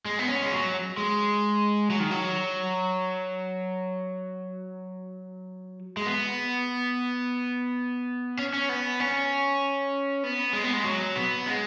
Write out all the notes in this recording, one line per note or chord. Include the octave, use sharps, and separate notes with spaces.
G#3
B3
C#4
G#3
F#3
G#3
F#3
D#3
F#3
G#3
B3
C#4
C#4
B3
C#4
B3
G#3
B3
G#3
F#3
B3
G#3